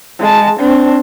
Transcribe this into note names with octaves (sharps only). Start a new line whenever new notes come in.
G#3 A5
C4 D4